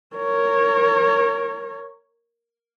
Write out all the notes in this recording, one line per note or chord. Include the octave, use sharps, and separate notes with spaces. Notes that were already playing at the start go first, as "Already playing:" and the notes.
A#4 C#5